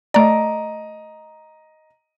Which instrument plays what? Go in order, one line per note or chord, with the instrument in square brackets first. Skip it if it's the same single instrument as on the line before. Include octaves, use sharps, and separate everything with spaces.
[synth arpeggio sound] A3 D5 [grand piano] D#5 A#5